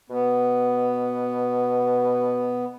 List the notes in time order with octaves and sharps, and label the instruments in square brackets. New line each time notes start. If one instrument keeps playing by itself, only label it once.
[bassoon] B2 [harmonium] B3